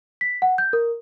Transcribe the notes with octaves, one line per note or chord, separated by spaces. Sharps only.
B6
F#5
G6
A#4